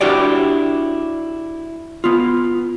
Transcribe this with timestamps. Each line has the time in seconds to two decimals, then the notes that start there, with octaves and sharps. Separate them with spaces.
0.01 D4 E4 F#4 G4 C#5 D5
2.04 B3 F4